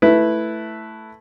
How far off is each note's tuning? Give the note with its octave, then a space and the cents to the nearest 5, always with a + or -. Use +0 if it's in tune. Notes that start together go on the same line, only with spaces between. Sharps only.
A3 +0 E4 +0 B4 +0